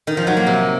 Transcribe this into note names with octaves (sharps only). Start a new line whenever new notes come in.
D#3
F3
F#3
A#3
C3